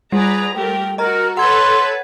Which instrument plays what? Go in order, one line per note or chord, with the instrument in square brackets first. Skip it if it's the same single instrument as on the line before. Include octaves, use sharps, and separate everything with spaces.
[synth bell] G3 [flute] G#4 [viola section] B4 D5 A#5
[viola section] A3 G4 A#4 [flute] G5
[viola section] F#4 [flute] A#4 [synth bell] D#5 A#5
[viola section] A4 B4 C#5 [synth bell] F#5 G#6 [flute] C6